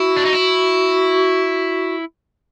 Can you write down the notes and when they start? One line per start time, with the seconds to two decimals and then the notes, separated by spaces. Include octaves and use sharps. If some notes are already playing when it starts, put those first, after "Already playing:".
Already playing: E4 F#4
0.17 D4
0.25 D#4
0.33 E4